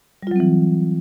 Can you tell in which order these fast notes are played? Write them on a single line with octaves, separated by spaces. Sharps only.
G3 F4 F#3 C4 E3